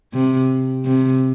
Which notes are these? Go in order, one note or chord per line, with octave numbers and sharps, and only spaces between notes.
C3
C3